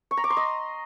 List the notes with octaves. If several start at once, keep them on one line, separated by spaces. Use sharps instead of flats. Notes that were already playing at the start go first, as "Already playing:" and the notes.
C#6
A#5
D6
C6
D#5